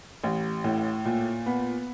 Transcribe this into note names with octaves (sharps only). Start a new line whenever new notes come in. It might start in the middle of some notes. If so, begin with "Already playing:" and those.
A1
A2
A#2
B3